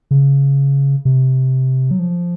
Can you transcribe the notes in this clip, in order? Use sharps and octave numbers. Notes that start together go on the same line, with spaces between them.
C#3
C3
F#3
F3